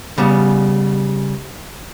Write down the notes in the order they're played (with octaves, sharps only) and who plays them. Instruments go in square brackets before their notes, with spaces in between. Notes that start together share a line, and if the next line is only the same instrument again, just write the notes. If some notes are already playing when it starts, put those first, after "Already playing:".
[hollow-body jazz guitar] C#3 G3 B3